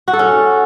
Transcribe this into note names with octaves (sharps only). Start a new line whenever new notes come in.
F#4
A4
C#4